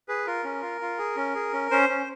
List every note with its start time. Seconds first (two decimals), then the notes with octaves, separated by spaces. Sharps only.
0.08 G#4 B4
0.27 F4 A#4
0.44 C#4
0.62 F4
0.81 F4
0.99 G#4
1.16 C#4
1.35 G#4
1.52 C#4
1.71 C#4 C5
1.89 C#4